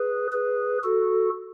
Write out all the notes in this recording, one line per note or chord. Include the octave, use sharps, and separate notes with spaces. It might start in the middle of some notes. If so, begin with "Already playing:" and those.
Already playing: G#4 B4
G#4 B4
F#4 A4